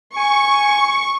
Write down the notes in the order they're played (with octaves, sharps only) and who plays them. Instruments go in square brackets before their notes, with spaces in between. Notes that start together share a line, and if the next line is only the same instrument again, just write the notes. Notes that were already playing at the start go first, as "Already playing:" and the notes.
[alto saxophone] G#5 [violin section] C#6